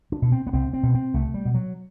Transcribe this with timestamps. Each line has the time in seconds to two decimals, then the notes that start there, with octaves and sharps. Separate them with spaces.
0.12 D4
0.22 B2
0.32 C4
0.47 B3
0.53 C2 C4
0.73 C4
0.83 B2
0.94 C4
1.14 C2 A3
1.34 G3
1.45 B2
1.54 F#3